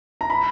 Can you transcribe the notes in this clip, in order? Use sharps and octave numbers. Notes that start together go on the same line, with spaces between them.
A#5
B5